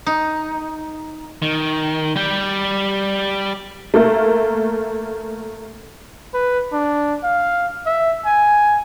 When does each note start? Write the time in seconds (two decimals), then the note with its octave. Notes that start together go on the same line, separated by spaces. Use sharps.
0.06 D#4
1.42 D#3
2.16 G3 G5
3.94 A3 A#3 A#4
6.34 B4
6.73 D4
7.24 F5
7.86 E5
8.26 G#5